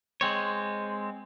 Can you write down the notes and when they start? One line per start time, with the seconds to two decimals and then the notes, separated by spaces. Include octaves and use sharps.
0.21 G#3 C4 C#5